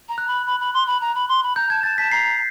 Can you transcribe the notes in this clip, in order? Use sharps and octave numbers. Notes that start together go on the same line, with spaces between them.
A#5
F#6
B5
B5
B5
C6
B5
A#5
B5
C6
B5
A#5 G6
A5 G#6
A5 A6
A5 B6
A#5 C7